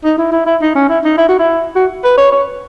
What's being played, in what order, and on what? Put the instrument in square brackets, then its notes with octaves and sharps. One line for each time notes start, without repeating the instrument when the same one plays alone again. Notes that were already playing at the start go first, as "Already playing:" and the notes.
[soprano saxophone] D#4
E4
E4
E4
D#4
C#4
E4
D#4
E4
F#4
E4
F#4
B4
C#5
C#5